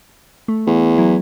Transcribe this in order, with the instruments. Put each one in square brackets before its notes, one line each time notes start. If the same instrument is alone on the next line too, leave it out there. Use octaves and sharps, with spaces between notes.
[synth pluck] A3
[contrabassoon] E2
[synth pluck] F#3 E4